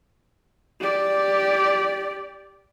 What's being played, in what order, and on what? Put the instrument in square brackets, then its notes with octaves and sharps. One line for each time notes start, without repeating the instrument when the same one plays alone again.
[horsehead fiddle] G4 D5